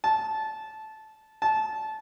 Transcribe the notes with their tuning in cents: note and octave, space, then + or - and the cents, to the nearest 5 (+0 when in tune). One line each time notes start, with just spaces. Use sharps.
A5 -15
A5 -20